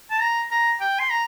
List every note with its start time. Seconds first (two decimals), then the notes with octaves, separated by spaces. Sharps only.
0.11 A5
0.21 A#5
0.51 A#5
0.81 G5
1.00 C6
1.10 A#5